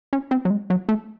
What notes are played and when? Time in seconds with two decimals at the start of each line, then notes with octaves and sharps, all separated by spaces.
0.13 C#4
0.31 C4
0.45 F#3
0.50 G#3
0.70 F#3
0.89 A3